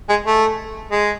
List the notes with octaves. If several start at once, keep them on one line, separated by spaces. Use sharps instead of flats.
G#3
A3
G#3